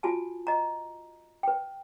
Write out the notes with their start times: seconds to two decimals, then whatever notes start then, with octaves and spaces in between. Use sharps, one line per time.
0.03 F4 F#4 G#5 A5
0.47 D#5 A#5
1.43 B4 G5